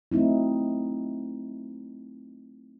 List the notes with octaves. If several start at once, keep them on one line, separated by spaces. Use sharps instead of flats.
F#3 A3 C4 D#4 E4